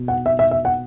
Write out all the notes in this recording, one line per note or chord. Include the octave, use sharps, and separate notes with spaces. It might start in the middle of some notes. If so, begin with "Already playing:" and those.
Already playing: B2
F#5
E5
E5
E5
F#5